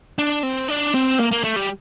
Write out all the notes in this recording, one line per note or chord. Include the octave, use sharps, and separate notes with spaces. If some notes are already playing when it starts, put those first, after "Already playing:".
D4
C4
D4
C4
A#3
A#3
A3
G3